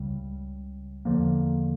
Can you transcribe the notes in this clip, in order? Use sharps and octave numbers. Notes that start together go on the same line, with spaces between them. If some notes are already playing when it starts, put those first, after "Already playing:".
Already playing: C#2 C#3 G3
E2 D3 F3 A#3